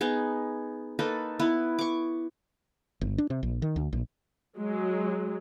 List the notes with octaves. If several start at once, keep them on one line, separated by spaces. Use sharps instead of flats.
B3 D#4 G#4
A#3 D#4 A4 B4
B3 E4 B4
C#6 D6
G1
D4
C3
A#1
D#3
D2
A#1
F#3 G#3